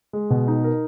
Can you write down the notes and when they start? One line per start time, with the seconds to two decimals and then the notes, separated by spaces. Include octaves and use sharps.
0.13 G#3
0.30 B2
0.48 D#4
0.64 A#4